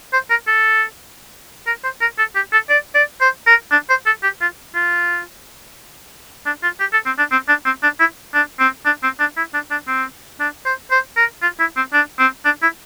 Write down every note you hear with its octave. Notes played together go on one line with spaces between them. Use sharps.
C5
A#4
A4
A#4
C5
A#4
A4
G4
A4
D5
D5
C5
A#4
D4
C5
A4
G4
F4
F4
D4
F4
G4
A4
C4
D4
C4
D4
C4
D4
E4
D4
C4
D4
C4
D4
E4
D4
D4
C4
D4
C5
C5
A#4
F4
E4
C4
D4
C4
D4
E4